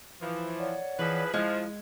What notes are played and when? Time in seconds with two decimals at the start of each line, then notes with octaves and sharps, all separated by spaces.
0.21 E3 F3
0.58 C#5 D5 F#5
0.99 E3 F3 G#4 B4
1.34 F3 G#3 E4 D#5